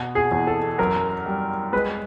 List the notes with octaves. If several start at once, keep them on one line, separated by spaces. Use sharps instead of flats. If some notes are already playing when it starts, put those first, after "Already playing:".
Already playing: B2
G#4
E2
A4
F#2 A#4
G3
G#3 B4